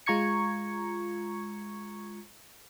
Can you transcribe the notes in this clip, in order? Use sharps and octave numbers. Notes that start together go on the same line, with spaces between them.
G#3 F4 A#5 C#6 G#6 C#7